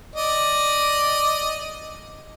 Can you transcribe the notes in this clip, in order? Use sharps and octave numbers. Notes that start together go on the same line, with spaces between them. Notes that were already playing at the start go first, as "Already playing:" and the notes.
D5 D#5